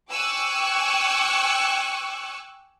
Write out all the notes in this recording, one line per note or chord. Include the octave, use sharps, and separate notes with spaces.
G5 G#5 C#6 D6 E6 F#6